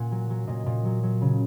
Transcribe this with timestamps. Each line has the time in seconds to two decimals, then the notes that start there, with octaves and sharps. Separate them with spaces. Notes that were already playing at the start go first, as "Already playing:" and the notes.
Already playing: A#2 F#5 G#5
0.12 F#3
0.30 F#3
0.47 A#2 D#5
0.66 A#2
0.85 F#3
1.03 F#3
1.21 C#3